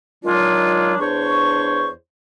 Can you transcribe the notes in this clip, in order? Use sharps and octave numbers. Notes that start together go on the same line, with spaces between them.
D#3 F#3 G#3 D4 F4
E2 D4 C5 C#5 C#6